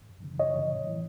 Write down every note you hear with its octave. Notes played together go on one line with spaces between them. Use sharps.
F#2
C#3 E3
F#2 C#5 D#5
C#3 E3
A2
E3